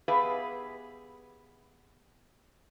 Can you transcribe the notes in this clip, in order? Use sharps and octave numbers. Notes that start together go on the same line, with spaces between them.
B3 G4 G#4 B4 E5 F5